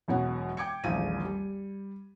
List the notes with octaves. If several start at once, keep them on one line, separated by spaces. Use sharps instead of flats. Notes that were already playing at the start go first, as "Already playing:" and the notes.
E1 F#2 B2 C#5 F#5
G5 D6 G#6 C#7
D#1 A#1 E2 F3 A3 D#7
G3